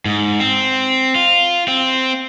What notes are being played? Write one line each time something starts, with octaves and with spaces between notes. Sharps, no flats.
G#2
C4
F4
C4